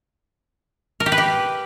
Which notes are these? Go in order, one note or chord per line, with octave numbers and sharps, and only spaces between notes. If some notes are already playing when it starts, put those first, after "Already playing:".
A#4
G4
B4
G4